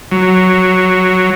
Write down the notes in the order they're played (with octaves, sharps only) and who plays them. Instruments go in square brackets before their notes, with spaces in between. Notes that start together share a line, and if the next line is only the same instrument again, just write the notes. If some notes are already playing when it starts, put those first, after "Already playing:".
[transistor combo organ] F#3